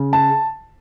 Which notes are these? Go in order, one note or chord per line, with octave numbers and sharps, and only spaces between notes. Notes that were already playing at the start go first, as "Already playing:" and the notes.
Already playing: C#3
A5